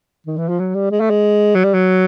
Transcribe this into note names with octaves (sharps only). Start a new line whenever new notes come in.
D#3
E3
F3
F#3
G3
G#3
A3
G#3
F#3
G3
F#3